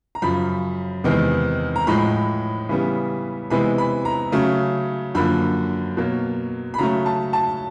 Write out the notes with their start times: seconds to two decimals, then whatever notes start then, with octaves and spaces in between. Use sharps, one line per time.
0.15 A#5
0.22 F#2 C#3 F3 B5
1.04 E2 C3 D#3 G#3 B3
1.76 A#5
1.87 A2 F3 G#3 B5
2.69 C#3 E3 G3 B3
3.50 C3 E3 G#3 B3 B5
3.78 B5
4.05 A#5
4.32 C#3 F#3 A3
5.15 F#2 D3 F3 A#3 B5
5.97 B2 F#3 A#3
6.74 B5
6.78 C#3 F#3 A3 A#5
7.06 A5
7.33 A5